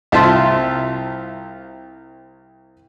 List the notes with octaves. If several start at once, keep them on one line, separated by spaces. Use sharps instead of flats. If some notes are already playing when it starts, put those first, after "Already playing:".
C2 F4 E5 A5 C6